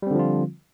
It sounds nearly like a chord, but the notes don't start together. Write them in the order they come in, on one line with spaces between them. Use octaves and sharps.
G3 C4 D3 F3 F4